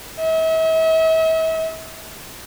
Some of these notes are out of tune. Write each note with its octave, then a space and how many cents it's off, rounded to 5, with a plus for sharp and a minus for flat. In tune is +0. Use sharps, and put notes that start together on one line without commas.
E5 -40